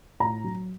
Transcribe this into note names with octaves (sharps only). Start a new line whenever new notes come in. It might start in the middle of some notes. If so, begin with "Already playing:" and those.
A2 A#5
F#3